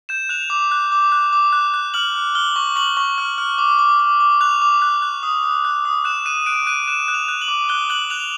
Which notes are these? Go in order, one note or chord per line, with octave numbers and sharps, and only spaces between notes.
G6 E7
F#6 F7
D6
F#6
D6
F#6
D6
F#6
F#6
F6 F#7
F6
F6 G7
C#6
C#6 F#7
C#6
F6
F6
D6
D6
D6
D6
F#6 F7
D6
F#6
F#6
D#6
D#6
F#6
D#6
F#6 E7
F#6 D#7
F#6 D7
F#6 D#7
F#6 E7
F#6
F7
F#6
F#7
D6
F#6 G7
F#6 F#7
F#6 F7